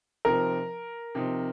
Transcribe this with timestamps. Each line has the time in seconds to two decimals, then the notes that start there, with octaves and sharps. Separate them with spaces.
0.25 C3 F3 C4 D#4 A#4
1.15 C3 F3 C4 D#4